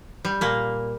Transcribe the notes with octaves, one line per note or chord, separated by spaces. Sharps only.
G3
A#2 A#3